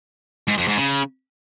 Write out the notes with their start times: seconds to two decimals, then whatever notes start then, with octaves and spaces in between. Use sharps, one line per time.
0.48 G#2
0.58 F2
0.68 G#2
0.77 C#3